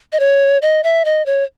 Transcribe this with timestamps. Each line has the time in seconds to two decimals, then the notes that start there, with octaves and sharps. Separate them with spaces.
0.13 D#5
0.20 C#5
0.62 D#5
0.84 E5
1.05 D#5
1.26 C#5